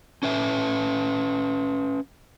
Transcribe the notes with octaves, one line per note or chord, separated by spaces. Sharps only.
C#4 B4 E5